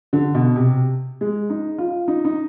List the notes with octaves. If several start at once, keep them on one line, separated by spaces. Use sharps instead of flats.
D3
B2
C3
G#3
D#4
F4
D#4
D#4